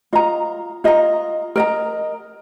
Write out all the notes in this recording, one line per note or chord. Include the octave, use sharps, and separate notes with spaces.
F4 D#5 A#5
F4 D#5 A#5
A#4 D#5 A#5